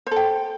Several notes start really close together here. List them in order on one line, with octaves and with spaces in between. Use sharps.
C5 A4 G5